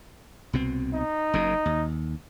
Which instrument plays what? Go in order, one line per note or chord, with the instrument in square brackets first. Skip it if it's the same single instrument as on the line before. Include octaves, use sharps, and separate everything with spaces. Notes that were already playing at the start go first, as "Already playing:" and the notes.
[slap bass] C2 B2 C4
[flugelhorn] D#4
[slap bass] F#1 F#2 C#3
D#2